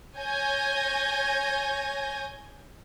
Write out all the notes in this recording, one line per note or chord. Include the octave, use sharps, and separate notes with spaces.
C#5 G#5 G6 G#6 A#6